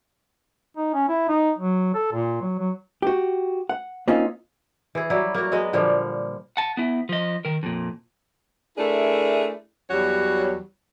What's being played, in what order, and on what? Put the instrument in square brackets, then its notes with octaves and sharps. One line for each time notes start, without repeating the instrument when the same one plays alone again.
[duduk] D#4
C#4
E4
D#4
F#3
A4
A#2
F#3
F#3
[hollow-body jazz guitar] F#4 G4
F#5
A#3 C4 C#4 D#4 F4
[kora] E3 G#4
F#3 G3 E4
A#3 F#4
F#3 G#3 B3 D#5
A#2 D3 F3 G3
[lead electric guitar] F#5 A5
B3 E4
F3 D#5
D#3 A#4
F2 A#2
[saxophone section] A3 D4 E4 G#4 A#4
E2 F#3 G3 F#4 C#5